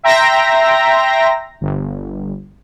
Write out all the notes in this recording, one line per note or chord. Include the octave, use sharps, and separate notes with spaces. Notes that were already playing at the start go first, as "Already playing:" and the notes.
E5 G5 A#5 C6 A#6
G1